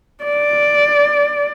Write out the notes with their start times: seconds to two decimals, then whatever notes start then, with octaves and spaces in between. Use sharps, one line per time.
0.24 D5